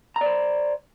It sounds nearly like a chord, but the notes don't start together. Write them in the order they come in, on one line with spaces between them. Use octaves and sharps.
A#5 D5 C5